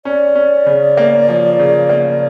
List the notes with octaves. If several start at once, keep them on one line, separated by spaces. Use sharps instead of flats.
C#4 D5
C#4
C#3
A#3
F3
C#3
A#3